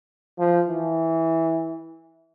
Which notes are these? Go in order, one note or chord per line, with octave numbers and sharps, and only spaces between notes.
F3
E3